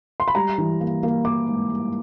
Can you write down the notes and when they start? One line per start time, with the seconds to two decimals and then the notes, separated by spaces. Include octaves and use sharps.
0.20 C6
0.28 B5
0.35 G3 A#5
0.58 E3
0.81 A#3
1.03 A#3
1.25 A#3 D6
1.47 G#2
1.70 G3